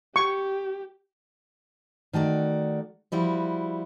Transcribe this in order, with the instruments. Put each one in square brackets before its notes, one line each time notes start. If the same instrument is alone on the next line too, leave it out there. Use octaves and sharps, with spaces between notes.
[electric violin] G4 [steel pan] C#6
[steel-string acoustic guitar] D#3 A3 F#4 D5
F3 G3 E4 F#4